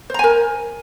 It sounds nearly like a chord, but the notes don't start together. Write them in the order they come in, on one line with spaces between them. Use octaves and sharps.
C5 A#5 G#5 A#4